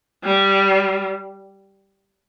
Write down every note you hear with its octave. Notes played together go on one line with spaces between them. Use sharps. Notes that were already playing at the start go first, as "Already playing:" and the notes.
G3